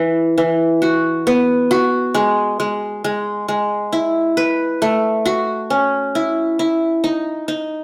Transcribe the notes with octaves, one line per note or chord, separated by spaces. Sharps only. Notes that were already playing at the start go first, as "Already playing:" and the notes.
Already playing: E3 B4
E3
F#4
B3
F#4
G#3
G#3
G#3
G#3
E4
B4
A3
F#4
C#4
E4
E4
D#4
D#4